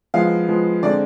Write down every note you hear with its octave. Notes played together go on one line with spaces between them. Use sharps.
F3 G#3 B3 F5
F3 G#3 B3
D3 G#3 C4 D5